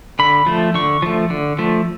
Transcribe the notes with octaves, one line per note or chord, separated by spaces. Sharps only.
D3 B5
F3 A3
D3 C#6
F3 A3
D3
F3 A3